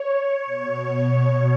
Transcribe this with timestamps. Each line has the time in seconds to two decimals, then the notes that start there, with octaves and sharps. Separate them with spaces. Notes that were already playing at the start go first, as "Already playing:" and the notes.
Already playing: C#5
0.46 B2